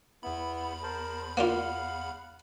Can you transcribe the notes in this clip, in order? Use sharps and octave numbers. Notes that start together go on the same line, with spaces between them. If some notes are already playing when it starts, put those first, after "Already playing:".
E2 B3 E4 B5
A#4 C5 A5
A#3 D4 F4 F5 F#5